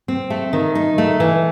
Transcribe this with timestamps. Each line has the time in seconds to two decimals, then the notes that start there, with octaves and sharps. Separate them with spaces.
0.08 C4
0.30 A3
0.53 D#3
0.75 D#4
0.98 A3
1.20 E3